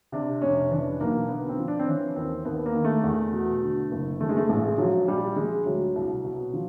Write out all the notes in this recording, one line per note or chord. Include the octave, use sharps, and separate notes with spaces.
C3 D4
F1 C#4
E3 D4
B1 A#3
D3 B3
C4
F3
D4
C4
E3 C#4
D#2 C4
D#2 B3
A#3
D#3
A3
E2
B2
D3
F#1
E3 A3
G#3
A3
A1 G#3
F3 F#3
A#1 G3
F3 G#3
D2 F#3
C2
B2
F3